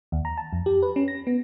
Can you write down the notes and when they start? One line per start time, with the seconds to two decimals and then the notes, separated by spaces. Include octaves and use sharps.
0.12 D#2
0.25 A#5
0.37 A5
0.53 F2
0.66 G4
0.82 B4
0.96 C#4
1.08 A#6
1.27 B3